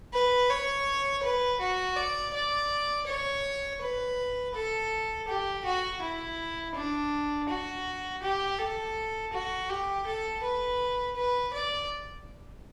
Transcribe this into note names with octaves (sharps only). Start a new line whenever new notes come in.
B4
C#5
B4
F#4
D5
D5
C#5
B4
A4
G4
F#4
E4
D4
F#4
G4
A4
F#4
G4
A4
B4
B4
D5